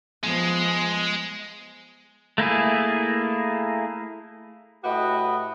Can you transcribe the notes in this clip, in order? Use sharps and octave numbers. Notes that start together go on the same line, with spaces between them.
F3 G#3 B3
A3 A#3 E4 G#4
A2 F#4 G4 B4 D#5